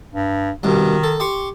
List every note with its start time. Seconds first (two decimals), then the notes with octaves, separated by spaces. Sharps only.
0.13 G2
0.63 C2 G2 B2 D#3
1.04 A4
1.20 G4 C6 C#6